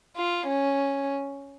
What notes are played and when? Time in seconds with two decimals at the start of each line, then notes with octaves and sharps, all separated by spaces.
0.17 F4
0.46 C#4